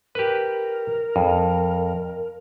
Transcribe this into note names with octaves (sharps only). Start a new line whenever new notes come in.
G4 A#4 B4
F2